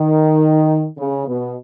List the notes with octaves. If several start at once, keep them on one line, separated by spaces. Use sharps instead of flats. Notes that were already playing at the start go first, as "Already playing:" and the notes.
Already playing: D#3
C#3
B2